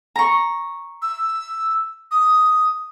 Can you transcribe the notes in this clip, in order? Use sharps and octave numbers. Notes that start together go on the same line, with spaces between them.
A#5 C#6
E6
D#6